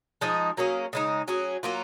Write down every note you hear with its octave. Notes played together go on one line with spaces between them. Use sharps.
F3 G#3 D#4 G#4
F#3 A#3 C#4 G#4
C#3 G#3 D#4
F#3 C#4 G#4
F#3 A#3 C#4 F4